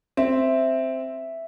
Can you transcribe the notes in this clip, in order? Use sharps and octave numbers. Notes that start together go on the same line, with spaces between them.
C4 E5